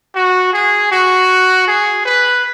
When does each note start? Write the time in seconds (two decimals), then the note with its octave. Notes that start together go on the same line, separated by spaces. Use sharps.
0.15 F#4
0.53 G#4
0.91 F#4
1.67 G#4
2.05 B4